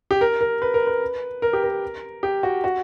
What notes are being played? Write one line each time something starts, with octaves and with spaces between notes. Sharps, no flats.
G4
A#4
A#4
B4
A#4
B4
A#4
G4
A#4
G4
F#4
F#4